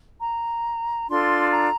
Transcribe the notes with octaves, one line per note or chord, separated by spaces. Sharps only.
A#5
D4 F4 A4 C6
A#5